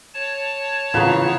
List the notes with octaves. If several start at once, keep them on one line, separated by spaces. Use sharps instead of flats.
C#5 A5
C#3 E3 F3 F#5 A#5